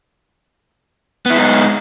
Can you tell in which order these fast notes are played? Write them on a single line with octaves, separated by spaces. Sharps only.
B3 E4 G#3 D#4